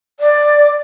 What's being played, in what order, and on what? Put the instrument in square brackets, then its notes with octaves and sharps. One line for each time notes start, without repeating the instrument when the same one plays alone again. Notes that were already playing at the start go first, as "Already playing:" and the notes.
[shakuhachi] D5